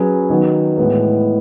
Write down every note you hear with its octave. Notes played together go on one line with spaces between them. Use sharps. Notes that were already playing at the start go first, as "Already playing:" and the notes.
Already playing: F#3 C#4 G#4 B4
D#3 F#3 B3
A2 E3 G#3 B3